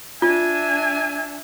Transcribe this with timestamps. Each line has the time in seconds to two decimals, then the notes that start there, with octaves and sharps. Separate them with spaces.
0.22 D4 F4 E5 G#5